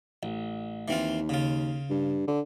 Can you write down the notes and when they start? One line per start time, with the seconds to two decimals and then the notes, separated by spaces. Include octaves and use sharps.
0.23 A1
0.88 D#2 E3 C4 F4
1.29 C#3 F4
1.90 G2
2.27 D3